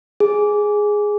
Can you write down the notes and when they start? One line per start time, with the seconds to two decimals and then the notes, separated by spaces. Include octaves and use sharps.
0.20 G#4